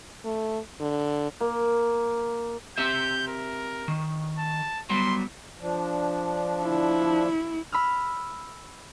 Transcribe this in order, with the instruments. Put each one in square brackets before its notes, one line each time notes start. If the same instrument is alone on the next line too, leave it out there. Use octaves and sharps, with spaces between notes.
[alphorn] A3
D3
[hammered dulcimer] A#3
[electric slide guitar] C4 G4 E5 [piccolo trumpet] G6
[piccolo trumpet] A#4
[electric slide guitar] D#3
[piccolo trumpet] A5
[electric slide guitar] F#3 G3 B3 [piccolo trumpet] C6
[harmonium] F3 D4
[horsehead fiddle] E4
[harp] B5 E6 F6